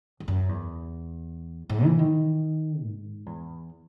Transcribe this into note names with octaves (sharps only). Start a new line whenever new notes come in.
E2
F#2
E2
G#2
E3
D#3
G#2
E2